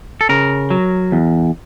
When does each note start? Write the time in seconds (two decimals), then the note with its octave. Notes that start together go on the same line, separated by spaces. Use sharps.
0.21 A4
0.29 C#3 A#4
0.71 F#3
1.12 E2